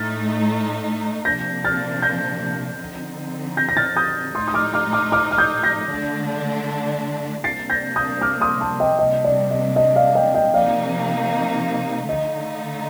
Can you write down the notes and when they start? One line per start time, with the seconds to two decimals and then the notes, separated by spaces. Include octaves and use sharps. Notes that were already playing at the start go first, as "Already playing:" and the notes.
Already playing: A2 A3 D#4 F6 A6
1.25 C3 F3 A#3 D4 G6 A#6
1.64 F6 A6
2.02 G6 A#6
2.80 D3 F3 C4 D#4
3.57 G6 A#6
3.69 A#6
3.77 F6 A6
3.96 D#6 G6
4.35 A2 A3 D#4 C6 D#6
4.48 D#6
4.54 D6 F6
4.74 D6 F6
4.93 D6 F6
5.12 D6 F6
5.31 F6
5.38 D#6 G6
5.63 G6 A#6
5.89 D3 A3 D4
7.44 C3 G3 A#3 D4 A6 C7
7.70 G6 A#6
7.96 D#6 G6
8.21 D6 F6
8.41 C6 D#6
8.61 A5 C6
8.80 D#5 G5
8.99 C3 G3 A#3 D4 D#5
9.24 D5
9.51 D#5
9.76 D#5
9.96 D5 F5
10.15 D#5 G5
10.34 D#5 G5
10.54 C3 F3 A#3 D#4 D5 F5
12.09 D3 A3 D#4 D#5